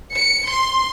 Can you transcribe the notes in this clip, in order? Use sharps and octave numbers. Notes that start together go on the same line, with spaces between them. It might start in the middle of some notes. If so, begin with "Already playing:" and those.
C#7
C6